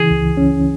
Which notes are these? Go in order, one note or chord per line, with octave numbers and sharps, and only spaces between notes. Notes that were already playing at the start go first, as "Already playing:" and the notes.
Already playing: C#3 E3 G#4
C#2
C#4